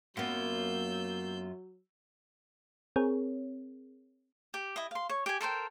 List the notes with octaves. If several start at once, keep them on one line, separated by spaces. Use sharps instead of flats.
F#2 F#3 A#3 B3 F4 E6 G6
C4 G#4 A#4 C#5
G4
E4 D#5
F5 C6
C#5
G4 G#5
A4 A#4 C5 G5